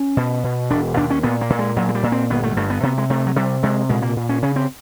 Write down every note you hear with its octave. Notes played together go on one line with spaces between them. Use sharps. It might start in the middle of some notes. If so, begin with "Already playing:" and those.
Already playing: C#4
B2
B2
E1 D4
D#2 D4
C#4
A#2 B3
A#3
A#2
G#3
A#2 F#3
G#3
G3
A#2
C4
G1 B3
A3
G2 A3
B3
C3 B3
G#3
C3 A3
F#3
C3 G3
C3 G#3
A#2 G#3
A#3
A#2
C#4
C#3 C#4
C4